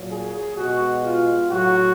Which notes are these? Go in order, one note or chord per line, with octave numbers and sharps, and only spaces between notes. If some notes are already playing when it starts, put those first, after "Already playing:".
Already playing: A#2 F#3
G#4
B2 G#3 F#4
F4
A2 F#3 F#4